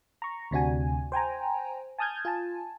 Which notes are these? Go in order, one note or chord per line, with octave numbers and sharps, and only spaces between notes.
A#5 C#6
D2 C3 D4 F#4 G#5
C5 G5 G#5 A#5
G#5 A5 D#6 F6 G6 G#6
F4 G#5 A5